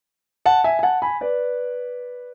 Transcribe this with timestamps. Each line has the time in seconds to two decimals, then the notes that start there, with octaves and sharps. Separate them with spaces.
0.46 F#5 A5
0.64 E5 G#5
0.79 G#5
0.83 F#5 A5
1.02 G#5 B5
1.21 B4 D5